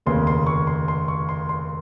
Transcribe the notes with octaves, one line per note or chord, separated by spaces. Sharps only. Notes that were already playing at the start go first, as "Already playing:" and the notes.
F1 D#2 C#3 C6
C6
C#6
C6
C6
C#6
C6
C6